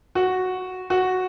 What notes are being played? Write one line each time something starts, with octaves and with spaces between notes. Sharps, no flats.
F#4
F#4